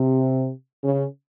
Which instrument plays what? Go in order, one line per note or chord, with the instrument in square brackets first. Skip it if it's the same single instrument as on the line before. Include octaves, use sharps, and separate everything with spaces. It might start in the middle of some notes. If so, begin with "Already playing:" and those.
Already playing: [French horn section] C3
C#3